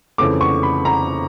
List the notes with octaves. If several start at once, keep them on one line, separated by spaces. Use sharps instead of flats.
F2 C#3 E3 A3 D6
C#6
B5
A#5